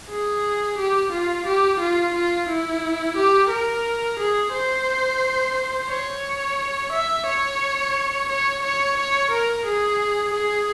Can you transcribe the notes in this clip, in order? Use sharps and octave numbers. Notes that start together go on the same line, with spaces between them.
G#4
G4
F4
G4
F4
F4
E4
G4
A#4
G#4
C5
C#5
E5
C#5
C#5
C#5
C#5
A#4
G#4
G#4